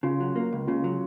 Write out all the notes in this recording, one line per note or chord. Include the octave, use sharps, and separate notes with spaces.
C#3 F4
F#3
A#3
C#2
C#3 F4
F#3